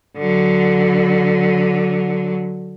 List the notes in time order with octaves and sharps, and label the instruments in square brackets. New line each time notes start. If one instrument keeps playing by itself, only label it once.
[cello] D3 F#3